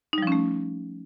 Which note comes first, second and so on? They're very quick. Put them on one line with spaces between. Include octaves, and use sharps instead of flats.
D#4 G3 F3 C#4 A3